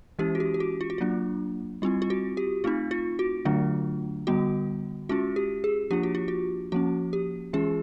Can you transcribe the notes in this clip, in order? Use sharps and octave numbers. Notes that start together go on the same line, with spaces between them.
E3 G#3 C#4 E4 G4
F#4
G4
G4
F#4
F4
F#4
F#3 A#3 D4 F4
G3 C4 E4 F4
F4
F#4
G4
A3 C4 D#4 F4
F4
F#4
D3 F#3 A3 D4 F4
D3 G3 B3 F#4
G#3 C#4 F4 F#4
G4
G#4
F3 A#3 D4 F4 G4
F#4
F4
F#4
F3 A#3 C#4 F#4
G4
E3 G#3 C#4 F4 G#4